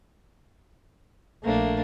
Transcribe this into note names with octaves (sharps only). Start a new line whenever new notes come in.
A#1 A3 A#3 D4